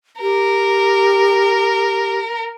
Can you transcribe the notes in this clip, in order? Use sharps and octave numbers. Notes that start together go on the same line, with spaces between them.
G4 A#4